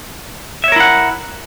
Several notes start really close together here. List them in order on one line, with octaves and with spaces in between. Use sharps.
E5 C#5 A#4 E4 F#5